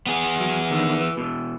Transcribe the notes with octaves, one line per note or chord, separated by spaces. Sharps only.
B3 G#4
F#3
E2 D3 D#3
E3
B2 E3